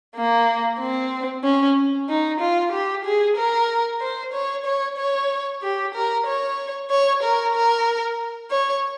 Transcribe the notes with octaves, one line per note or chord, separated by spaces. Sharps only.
A#3
C4
C#4
D#4
F4
G4
G#4
A#4
C5
C#5
C#5
C#5
G4
A#4
C#5
C#5
A#4
A#4
C#5